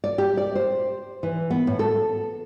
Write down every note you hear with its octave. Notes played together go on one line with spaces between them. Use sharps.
D5
G4
D5
C5
E3
B3
A2
A4